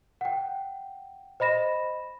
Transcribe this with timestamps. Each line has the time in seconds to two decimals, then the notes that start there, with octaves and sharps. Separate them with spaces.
0.21 F#5 G5
1.40 C5 D#5 B5 A#6 E7